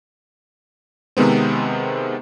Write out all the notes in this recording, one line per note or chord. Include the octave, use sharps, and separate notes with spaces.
C3 D#3 G#3 B3 C4